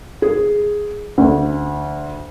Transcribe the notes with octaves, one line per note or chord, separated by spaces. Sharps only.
G#4
D2